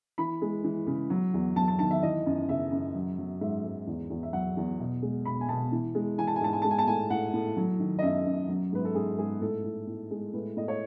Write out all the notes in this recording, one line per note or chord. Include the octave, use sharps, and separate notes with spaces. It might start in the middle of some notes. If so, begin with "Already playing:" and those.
E3 B5
G#3
E3
C#3
F#3
E2
F#3 A5
A5
D#3 A5
E5
E3 D#5
F#2
C#3 E5
F#2
F#3
F#3
G#2 E5
G#2
E2
E2
E5
F#3 F#5
E2
B2
G#3
B2 B5
G#5
B2 A5
E3
G#3
E3 G#5
A5
G#5
G#2 A5
G#5
G#3 A5
G#5
A5
A2 G#5
A2 F#5
A2
F#3
D#3
D#5
F#2 E5
F#2
F#3
G#2 B4
A4
G#2 G#4
G#2 G#4
A2 A4
A2
A2
G#3
A2 B4
A2 D#5
C#5